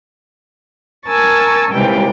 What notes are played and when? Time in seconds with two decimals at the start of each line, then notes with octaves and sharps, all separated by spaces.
1.08 A#4 G#5 A5 C#6 E6 A6
1.72 D#2 C3 E3 G3 G#3 G5